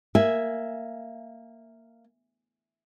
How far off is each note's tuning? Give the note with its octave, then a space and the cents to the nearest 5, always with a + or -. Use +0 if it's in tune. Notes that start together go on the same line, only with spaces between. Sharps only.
A#3 -10 E5 -5 G#5 +0